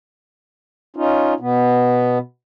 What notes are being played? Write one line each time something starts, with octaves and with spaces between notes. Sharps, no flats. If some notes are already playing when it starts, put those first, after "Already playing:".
C#4 D#4 F4
B2 B3